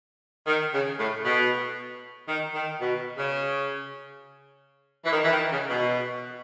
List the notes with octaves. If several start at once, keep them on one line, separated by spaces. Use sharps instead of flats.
D#3
C#3
A2
B2
D#3
D#3
B2
C#3
E3
D#3
E3
D#3
C#3
B2